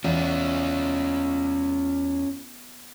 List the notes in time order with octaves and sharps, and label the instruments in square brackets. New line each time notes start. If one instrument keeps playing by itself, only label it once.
[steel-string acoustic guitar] E2 [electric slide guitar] C#4 F4